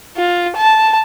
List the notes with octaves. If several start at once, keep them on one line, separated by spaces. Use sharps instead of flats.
F4
A5